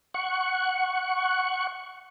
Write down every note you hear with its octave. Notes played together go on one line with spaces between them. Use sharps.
F#5 C#6